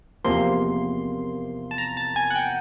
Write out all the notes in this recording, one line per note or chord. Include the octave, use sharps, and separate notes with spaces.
E2 C3 F3 A#3 C6
A5
A#5
A5
G#5
F#5
G5